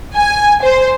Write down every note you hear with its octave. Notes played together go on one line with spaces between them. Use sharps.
G#5
C5